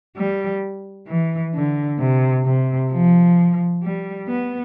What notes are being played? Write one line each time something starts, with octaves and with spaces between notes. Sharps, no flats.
G3
E3
D3
C3
C3
F3
G3
B3